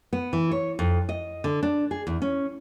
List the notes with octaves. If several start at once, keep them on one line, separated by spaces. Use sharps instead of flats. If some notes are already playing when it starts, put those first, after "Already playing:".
B3
E3
C#5
F2
D#5
D3
D4
G#4
E2
C#4